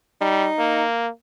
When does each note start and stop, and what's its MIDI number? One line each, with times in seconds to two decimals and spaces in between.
0.21 0.47 55
0.21 0.84 63
0.59 1.08 58